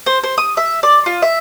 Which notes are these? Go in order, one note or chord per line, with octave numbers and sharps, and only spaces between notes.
C5
C5
D#6
E5
D5
F4
E5